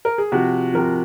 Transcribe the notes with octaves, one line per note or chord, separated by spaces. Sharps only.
A#4
G#4
C3 F3 F#4
C3 F3 A#4